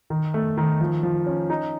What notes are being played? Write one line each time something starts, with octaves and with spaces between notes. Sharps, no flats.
D#3
A3
D#3
F3
F3
C#4
D#4